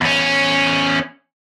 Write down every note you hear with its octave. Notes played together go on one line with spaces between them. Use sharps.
E2 C#4